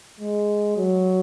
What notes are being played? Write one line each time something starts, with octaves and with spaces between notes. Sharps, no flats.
G#3
F#3